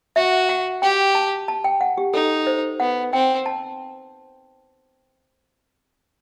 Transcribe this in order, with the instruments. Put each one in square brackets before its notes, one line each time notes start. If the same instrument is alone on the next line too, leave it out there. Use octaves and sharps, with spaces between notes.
[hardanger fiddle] F#4 [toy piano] E5
[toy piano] F#5
[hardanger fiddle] G4 [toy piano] G5
[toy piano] A5
A5
G5
F#5
G4
[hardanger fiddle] D#4 [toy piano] A4
[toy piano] C5
[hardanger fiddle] B3 [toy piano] F#5
[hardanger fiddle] C4 [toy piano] G5
[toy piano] A5